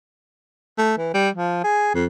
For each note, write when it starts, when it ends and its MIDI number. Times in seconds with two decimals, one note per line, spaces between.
0.78 0.98 57
0.98 1.11 52
1.14 1.30 55
1.35 1.63 53
1.64 1.92 68
1.94 2.06 41